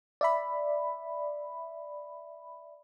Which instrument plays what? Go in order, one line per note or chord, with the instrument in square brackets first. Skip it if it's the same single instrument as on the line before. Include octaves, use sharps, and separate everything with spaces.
[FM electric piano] D5 E5 B5